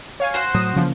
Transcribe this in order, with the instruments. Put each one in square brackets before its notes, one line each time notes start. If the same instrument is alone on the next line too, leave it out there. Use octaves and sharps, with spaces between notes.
[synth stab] C#5 F5 G#5
[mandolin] F#4 C5 F#5
[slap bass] A2 F#3 [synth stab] D#6
[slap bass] C#3 E3 A#3 [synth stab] F3